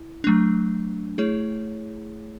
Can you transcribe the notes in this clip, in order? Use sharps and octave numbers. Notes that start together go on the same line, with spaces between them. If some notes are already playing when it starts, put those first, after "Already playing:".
Already playing: E4
F#3 A3 D4
A3 E4 G#4 C#5